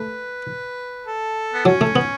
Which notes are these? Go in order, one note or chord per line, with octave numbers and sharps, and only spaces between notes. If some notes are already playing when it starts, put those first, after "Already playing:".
Already playing: A3 B4
A4
B3
F#3 C#4
A3
B3